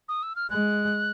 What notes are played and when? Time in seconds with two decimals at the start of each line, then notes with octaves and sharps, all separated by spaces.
0.08 D#6
0.23 E6
0.36 F6
0.50 G#3 F#6